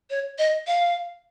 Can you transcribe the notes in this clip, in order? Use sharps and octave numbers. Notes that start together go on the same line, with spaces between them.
C#5
D#5
F5